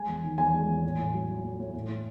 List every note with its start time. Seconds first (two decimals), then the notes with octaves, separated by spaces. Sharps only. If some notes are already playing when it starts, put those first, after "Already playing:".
Already playing: G#3 G#5
0.08 E2
0.24 D#3
0.38 E2 G#5
0.54 G#3
0.68 E2
0.84 A2
0.98 A2
1.14 F#3
1.28 F#3
1.44 A2
1.60 A2
1.74 A2
1.89 A2